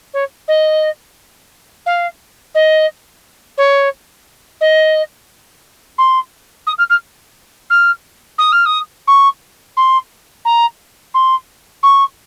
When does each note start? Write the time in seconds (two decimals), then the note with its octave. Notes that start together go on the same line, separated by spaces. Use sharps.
0.13 C#5
0.48 D#5
1.86 F5
2.54 D#5
3.57 C#5
4.60 D#5
5.98 C6
6.66 D#6
6.78 F6
6.90 F6
7.70 F6
8.38 D#6
8.52 F6
8.65 D#6
9.07 C#6
9.77 C6
10.45 A#5
11.14 C6
11.83 C#6